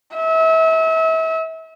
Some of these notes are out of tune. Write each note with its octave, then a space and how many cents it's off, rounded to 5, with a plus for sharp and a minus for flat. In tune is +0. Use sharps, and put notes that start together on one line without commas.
E5 -35